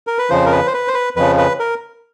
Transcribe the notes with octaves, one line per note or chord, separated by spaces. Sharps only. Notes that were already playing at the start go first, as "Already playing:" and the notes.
A#4
B4
F2 C#3 F3 C5
A#4
B4
C5
B4
C5
B4
F2 C#3 F3 B4
B4
A#4